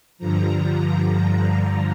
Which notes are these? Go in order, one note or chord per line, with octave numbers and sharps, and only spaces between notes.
G2 D3 F3 A#5